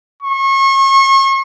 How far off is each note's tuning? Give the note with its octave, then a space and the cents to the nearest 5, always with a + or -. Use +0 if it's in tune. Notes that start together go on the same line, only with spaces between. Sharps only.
C#6 -35